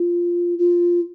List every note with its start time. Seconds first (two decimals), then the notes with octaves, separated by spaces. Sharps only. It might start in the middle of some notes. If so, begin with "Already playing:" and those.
Already playing: F4
0.59 F4